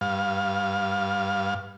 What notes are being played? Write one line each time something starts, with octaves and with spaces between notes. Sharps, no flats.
G2 F5